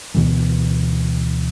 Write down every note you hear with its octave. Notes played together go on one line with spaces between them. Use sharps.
D2 B2 D#3 E3